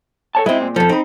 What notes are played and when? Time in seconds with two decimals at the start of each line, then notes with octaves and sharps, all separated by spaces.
0.35 A4 C#5 A5
0.46 G#3 C4 E4 D#5
0.61 A#2
0.76 F2 F3 A4
0.89 C4 D#4 B5